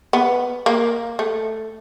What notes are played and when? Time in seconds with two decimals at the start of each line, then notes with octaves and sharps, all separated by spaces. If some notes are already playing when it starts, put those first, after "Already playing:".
0.13 B3
0.66 A#3
1.19 A3